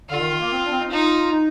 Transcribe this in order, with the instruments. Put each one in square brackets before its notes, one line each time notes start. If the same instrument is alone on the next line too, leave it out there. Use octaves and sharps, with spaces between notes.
[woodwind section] D3 [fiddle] F4
[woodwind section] D#3
D#3
A#3
C4
D4
C4
D#4
[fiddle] D#4 [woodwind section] F4
[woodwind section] D#4